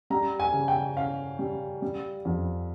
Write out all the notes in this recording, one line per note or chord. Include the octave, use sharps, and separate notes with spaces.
G3 A#5
G#5
C#3
G5
C#4 F5
G3
G3
F2